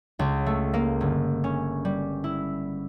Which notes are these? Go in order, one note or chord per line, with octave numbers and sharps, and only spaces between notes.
C#2
A3
A#3
G1
C#4
G3
E4